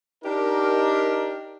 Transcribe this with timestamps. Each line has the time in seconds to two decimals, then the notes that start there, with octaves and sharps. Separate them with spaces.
0.24 D4 D#4 G4 A#4